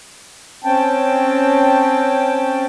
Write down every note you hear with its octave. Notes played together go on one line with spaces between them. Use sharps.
C4 C#4 G5 A5